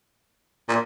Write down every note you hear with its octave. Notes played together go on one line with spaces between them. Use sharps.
A#2